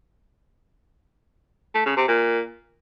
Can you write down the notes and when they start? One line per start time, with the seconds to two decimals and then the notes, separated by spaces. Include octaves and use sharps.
1.75 A3
1.86 C#3
1.97 C3
2.08 A#2